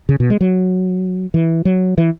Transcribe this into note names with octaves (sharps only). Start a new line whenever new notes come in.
C#3
B2
G#3
F#3
E3
F#3
E3